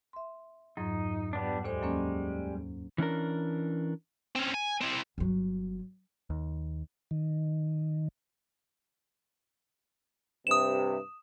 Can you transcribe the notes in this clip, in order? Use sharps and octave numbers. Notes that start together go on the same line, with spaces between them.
E5 C6
F2 G#2 F#3 D#4
G3 B3 D4
D#2 G3 G#3 A4 C5
F#3 A#3 C#4
E3 C#4 D4 A#4
C4 C#4
G#5
C4 E4
G1 F#3
D#2
D#3
G2 C3 D#6 E7